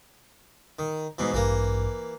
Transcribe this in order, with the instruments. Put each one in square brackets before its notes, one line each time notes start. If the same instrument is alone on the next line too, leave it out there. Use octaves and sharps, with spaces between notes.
[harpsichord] D#3
G#2 B2 E3
[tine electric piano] A1 G2 [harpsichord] E3 A#3